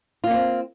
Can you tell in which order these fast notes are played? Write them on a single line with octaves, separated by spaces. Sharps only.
F4 A#3 C#4 C4